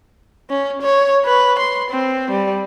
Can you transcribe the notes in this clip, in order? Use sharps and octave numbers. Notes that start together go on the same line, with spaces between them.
C#4
C#5
B4
C6
C4
G3